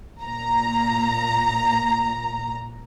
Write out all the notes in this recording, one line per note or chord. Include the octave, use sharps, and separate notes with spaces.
A#2 A#5